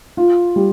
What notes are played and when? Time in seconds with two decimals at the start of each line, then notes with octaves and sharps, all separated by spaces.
0.17 F4
0.56 G3